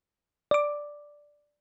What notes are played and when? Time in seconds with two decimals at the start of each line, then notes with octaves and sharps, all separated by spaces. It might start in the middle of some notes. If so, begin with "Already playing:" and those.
0.51 D5 D6